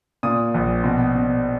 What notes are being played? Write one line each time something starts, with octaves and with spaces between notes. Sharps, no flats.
A#2 D#6
A#1
B2
B2